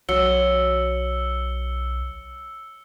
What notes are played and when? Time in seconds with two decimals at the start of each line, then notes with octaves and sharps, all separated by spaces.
0.09 B1 F#3 E6 C#7 G7